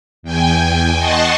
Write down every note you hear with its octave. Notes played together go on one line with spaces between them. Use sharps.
E2 G5 G#5
D#5 F#5 A5 C6 C#6